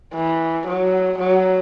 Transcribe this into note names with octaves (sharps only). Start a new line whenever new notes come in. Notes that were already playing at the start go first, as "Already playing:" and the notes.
E3
F#3
F#3